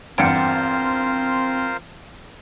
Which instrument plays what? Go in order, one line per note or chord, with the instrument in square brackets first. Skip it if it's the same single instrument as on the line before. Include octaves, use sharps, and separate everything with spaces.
[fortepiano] E2 G2 [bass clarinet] C4 [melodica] F4 A#4 C5 [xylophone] F#5 G5